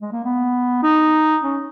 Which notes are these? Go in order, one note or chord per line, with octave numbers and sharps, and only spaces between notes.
G#3
A#3
B3
D#4
C#4